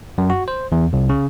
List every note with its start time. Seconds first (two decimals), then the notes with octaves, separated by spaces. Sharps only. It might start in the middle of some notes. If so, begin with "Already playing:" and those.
0.18 F#2
0.30 F#4
0.48 C5
0.72 E2
0.93 C2
1.09 C#3